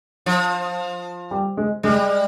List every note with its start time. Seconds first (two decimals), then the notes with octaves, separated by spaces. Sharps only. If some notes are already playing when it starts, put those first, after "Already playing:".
0.26 F3
1.31 G3
1.57 G#3
1.83 G3 G#3